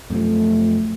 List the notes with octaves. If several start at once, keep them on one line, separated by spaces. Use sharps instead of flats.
F#2 C3 F3 A3